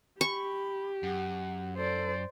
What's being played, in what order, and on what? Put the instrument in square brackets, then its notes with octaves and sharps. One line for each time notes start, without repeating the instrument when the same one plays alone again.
[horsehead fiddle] G4 [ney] B5 [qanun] C#6
[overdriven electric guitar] F#2 [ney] F#5
[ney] A4 [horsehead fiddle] C5 D5